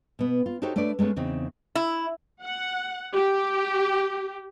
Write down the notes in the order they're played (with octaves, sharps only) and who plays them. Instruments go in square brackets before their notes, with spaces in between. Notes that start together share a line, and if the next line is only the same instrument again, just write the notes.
[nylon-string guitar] B2 B3
F4
D#4 F#4 G4 A4 C5 C#5
A3 D4 B4 C#5 D5
G#3 A3 B3 C#4
E2 C#3 C4 D#4
[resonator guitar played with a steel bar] E4
[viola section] F#5
G4